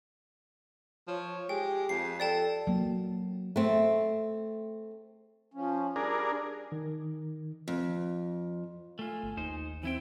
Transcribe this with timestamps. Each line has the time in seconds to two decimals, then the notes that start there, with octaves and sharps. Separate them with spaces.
1.08 F3 C#5
1.49 G#3 G4 G5
1.89 F2 C7
2.20 A4 D5 G5 A5
2.67 F#3 A#3
3.56 A3 C4
5.54 F3 C#4
5.96 G3 D4 G#4 A#4
6.72 D#3
7.68 F2
8.99 A3 F4 G#5
9.23 G1
9.37 D#2 D#4 C5
9.83 E3 C4 E4 G5